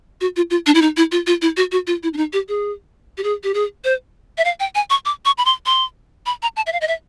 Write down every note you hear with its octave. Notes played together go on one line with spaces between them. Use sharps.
F#4
F4
F4
D4
E4
D#4
E4
F4
F4
E4
F#4
F#4
F4
E4
D4
D#4
G4
G#4
G4
G#4
G4
G#4
C5
E5
F5
G5
G#5
C#6
D6
C#6
B5
C6
C6
B5
A#5
A5
E5
F5
D#5
E5